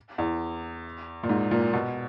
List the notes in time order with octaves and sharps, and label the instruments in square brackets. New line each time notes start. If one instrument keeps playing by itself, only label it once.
[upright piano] E2
A#2
G#2
A#2
B2